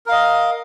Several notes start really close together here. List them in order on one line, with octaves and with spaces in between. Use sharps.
A#4 F5 D#5